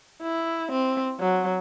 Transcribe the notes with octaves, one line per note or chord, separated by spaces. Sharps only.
E4
C4
F#3